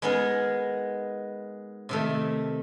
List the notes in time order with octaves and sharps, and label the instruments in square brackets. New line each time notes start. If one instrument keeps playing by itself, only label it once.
[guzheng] G#3 B3 D#4 G#4 A#4
C3 D#3 A3